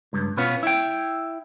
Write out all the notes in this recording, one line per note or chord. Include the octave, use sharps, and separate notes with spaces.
C#2 G2
B2 B3 C#4 F4
E4 G5